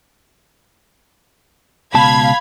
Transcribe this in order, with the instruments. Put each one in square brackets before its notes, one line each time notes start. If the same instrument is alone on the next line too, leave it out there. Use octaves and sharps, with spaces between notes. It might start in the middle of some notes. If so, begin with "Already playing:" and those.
[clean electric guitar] C#2 B2 A5 [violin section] F5 B5 G#6